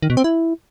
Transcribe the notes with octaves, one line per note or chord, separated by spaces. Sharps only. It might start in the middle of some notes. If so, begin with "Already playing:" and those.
D#3
B2
C4
E4